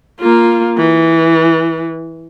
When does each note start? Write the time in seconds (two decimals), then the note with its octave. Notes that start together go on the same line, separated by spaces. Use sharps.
0.20 A#3 F4
0.78 E3